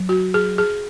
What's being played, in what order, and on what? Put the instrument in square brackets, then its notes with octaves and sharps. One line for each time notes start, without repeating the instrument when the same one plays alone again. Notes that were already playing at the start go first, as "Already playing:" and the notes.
Already playing: [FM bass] F#3
[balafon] F#4
G#4
G#4